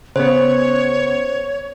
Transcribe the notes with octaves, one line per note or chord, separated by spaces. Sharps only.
C#3 B3 C5 C#5